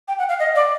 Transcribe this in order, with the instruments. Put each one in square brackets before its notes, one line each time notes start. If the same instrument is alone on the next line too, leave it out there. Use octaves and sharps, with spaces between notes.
[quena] G5
F#5
F5
D#5
D5